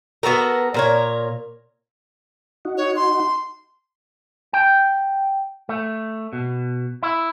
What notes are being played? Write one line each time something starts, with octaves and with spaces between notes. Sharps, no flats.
B3 F#4 A4 A#4
A#2 A#4 C#5
D#4 F#4
C#5
C6
G5
A3
B2
E4